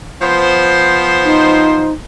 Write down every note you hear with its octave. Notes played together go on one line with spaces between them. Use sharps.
F3 B3 C5
D#4